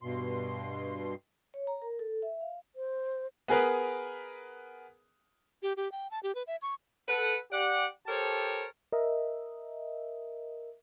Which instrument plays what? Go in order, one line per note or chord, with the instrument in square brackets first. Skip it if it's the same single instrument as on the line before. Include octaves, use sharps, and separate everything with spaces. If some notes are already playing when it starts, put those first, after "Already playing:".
[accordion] G2 B2 C6
[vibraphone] C#5
A#5
A#4
A4
E5
F5
[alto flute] C5
[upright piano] B3 G#4 A#4 B4
[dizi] G4
G4
G5
A5
G4
B4
E5
C#6
[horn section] A4 B4 F#5
G4 D5 F#5
G4 A4 A#4 C5 C#5 A5
[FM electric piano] A#4 D#5 E5